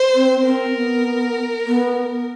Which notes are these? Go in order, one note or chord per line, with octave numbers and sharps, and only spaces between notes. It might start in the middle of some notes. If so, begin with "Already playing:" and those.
Already playing: C5
C4
C4 A#4
B3
B3